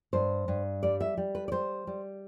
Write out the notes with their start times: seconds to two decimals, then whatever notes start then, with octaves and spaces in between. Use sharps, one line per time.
0.13 G2 C5
0.48 G2
0.83 G3 D5
1.00 E5
1.17 G3
1.35 B4
1.48 D5
1.52 G3 C5
1.87 G3